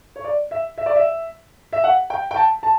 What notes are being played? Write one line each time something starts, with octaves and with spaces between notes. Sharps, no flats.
C#5
D5
E5
E5
D5
E5
E5
F#5
G5
G5
A5
A5